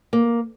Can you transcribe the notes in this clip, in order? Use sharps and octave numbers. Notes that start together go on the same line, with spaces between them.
A#3